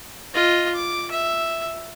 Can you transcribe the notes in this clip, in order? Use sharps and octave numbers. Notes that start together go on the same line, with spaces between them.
F4 D#5
D6
E5